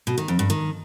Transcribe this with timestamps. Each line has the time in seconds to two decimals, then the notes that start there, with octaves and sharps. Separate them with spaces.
0.07 B2
0.18 D#3
0.28 F2
0.39 G2
0.50 D#3